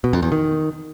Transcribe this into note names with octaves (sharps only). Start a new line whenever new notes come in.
B2
F2
E2
D#3